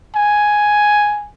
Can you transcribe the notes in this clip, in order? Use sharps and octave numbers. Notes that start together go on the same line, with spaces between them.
G#5